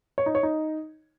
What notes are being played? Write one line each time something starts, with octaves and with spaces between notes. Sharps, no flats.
C#5
D#4
C#5
D#4